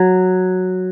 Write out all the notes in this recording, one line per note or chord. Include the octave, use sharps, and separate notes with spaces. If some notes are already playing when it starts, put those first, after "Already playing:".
Already playing: F#3